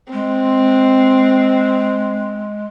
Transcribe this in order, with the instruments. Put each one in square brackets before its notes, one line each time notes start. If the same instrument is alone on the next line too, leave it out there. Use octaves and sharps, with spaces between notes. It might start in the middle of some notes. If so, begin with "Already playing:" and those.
[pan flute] G#3 [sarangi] C4